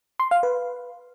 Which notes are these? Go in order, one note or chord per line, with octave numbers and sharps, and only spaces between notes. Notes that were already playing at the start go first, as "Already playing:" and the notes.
C6
F5
B4